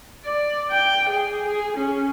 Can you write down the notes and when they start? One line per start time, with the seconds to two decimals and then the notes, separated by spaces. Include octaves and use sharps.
0.25 D5
0.71 G5
1.10 G#4
1.47 G#4
1.77 C#4